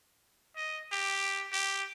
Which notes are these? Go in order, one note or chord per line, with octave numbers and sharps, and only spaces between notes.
D#5
G4
G4